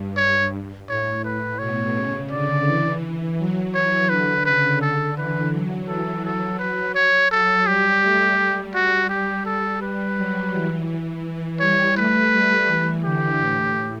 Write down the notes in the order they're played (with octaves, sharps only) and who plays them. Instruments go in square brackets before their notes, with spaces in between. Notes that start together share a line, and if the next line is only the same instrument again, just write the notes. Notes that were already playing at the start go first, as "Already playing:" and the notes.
Already playing: [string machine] G2
[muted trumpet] C#5
[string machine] A2 [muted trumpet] C#5
[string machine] A2 [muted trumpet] B4
[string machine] B2 [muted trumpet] C#5
[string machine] C#3
[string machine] D3 [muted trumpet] D5
[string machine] E3
E3
F#3
[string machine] E3 [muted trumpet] C#5
[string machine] D3 [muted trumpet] B4
[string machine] C#3 [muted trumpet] B4
[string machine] D3 [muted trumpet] A4
[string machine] E3 [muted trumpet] B4
[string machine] F#3
[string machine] E3 [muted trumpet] A4
[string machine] F#3 [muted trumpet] A4
[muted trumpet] B4
C#5
[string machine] F#3 [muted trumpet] A4
[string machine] G3 [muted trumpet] G4
[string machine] A3
G3
[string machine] G3 [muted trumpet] F#4
[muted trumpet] G4
[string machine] G3 [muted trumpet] A4
[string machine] G3 [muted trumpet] B4
[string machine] F#3
E3
E3
E3
[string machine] G3 [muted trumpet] C#5
[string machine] A3 [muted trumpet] B4
[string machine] G3
E3
[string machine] D3 [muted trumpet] G4
[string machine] A2